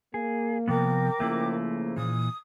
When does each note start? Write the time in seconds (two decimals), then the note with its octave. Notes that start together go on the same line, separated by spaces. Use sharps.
0.14 A#3 G#4
0.68 C3 F3 B3 A#4 G5 D6
1.20 C#3 F3 A3 A#3 E4
1.96 A#2 E3 D#6